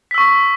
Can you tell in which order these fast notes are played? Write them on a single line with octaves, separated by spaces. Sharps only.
B6 E6 C#6